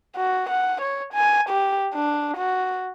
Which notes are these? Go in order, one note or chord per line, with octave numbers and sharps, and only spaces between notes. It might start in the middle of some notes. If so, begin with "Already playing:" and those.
F#4
F#5
C#5
G#5
G4
D4
F#4